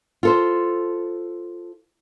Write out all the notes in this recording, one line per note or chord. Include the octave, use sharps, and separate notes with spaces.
F4 A4 C5